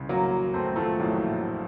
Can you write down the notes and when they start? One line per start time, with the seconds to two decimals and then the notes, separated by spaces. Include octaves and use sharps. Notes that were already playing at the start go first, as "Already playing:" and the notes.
Already playing: C2 C#3
0.09 F#3 A#3
0.54 A3 C4
0.76 F3 A3
0.99 A#1 A2 F#3 A#3